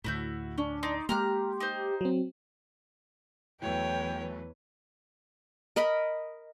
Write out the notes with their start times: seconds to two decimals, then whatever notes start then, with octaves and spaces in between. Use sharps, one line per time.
0.04 D2 A2 E4 F#4 G6
0.58 C#4 D4
0.83 D#4 D5 C6
1.09 G#3 A#3 G4 A#5 F6 F#6
1.61 D#4 C5
2.01 F#3 C4
3.62 E2 E3 F#3 A3 B4 C#5 G5
5.76 A#4 D#5 B5